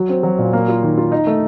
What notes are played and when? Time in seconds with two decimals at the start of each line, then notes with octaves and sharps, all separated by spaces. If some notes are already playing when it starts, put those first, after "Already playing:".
Already playing: F#3 F#4
0.09 C4
0.23 F#3
0.38 A#2
0.53 A#3
0.68 F4
0.83 D#3
0.98 F4
1.12 D#4
1.27 A3